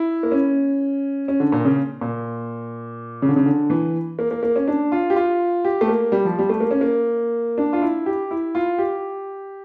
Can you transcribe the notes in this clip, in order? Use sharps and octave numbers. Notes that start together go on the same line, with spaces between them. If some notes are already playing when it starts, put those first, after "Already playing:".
Already playing: E4
A#3
C#4
C#4
D3
A#2
C#3
A#2
C#3
D3
C#3
D3
E3
A#3
A#3
A#3
C#4
D4
F4
G4
F4
G4
A3
A#3
G3
F3
G3
A3
A#3
C#4
A#3
D4
F4
E4
G4
E4
F4
G4